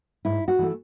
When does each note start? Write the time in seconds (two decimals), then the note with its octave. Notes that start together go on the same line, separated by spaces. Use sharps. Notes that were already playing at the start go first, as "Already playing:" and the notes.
0.25 G#2 E4
0.48 F#4
0.59 E3 A3